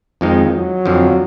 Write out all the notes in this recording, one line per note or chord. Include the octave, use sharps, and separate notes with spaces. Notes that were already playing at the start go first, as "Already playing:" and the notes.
F2 D#3 F3 G#3 D#4
F#3
F2 D3 F3